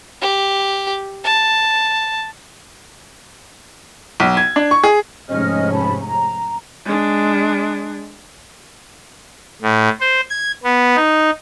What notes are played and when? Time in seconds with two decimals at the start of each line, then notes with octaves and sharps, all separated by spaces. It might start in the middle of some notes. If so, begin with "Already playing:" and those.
0.21 G4
1.24 A5
4.20 B1
4.37 G#6
4.56 D4
4.71 C#6
4.84 G#4
5.29 F1 G#2 C#4 D#5 F6
5.72 A5 B5
6.03 A#5
6.85 G#3 D4
9.62 A2
10.00 C5
10.30 G#6
10.64 B3
10.96 D#4